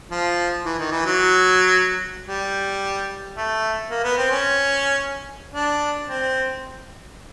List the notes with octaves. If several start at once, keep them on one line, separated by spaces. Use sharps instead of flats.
F3
E3
D#3
E3
F#3
G3
A3
A#3
B3
C4
C#4
D4
C4